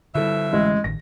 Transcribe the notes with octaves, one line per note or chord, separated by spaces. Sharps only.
B2 D3 F3 G3 E4 A4 E5
A1 G#3
A1 D#3 A#6